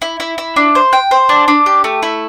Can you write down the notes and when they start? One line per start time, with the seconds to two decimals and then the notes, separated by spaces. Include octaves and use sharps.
0.02 E4
0.20 E4
0.38 E4
0.56 D4
0.75 C5
0.93 G5
1.11 C5
1.29 D4
1.48 D4
1.66 G4
1.84 A3
2.03 E4